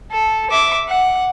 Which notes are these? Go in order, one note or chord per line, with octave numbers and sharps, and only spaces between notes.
A4
E5 D6
F#5